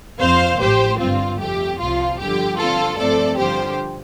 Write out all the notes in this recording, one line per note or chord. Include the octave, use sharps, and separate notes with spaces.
F2 F3 C4 C5 F5
A1 A2 F3 G4 C5
G1 G2 G3 C4 F4
F2 C3 A3 G4
C2 C3 F3 F4
G1 G2 D3 F3 G4
G2 D3 F3 C4 F4 A4
G2 F3 A3 C4 A4 D5
G2 D3 F3 G4 C5